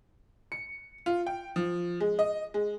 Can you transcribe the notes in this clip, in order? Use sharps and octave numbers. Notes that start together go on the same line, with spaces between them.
C#7
F4
G5
F3
G#3
D#5
G#3